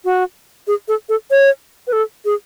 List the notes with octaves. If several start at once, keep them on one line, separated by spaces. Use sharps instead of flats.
F#4
G#4
A4
A4
C#5
B4
A4
G#4